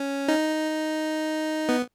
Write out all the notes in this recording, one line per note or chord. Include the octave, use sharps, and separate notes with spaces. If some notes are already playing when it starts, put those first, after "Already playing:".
Already playing: C#4
D#4
B3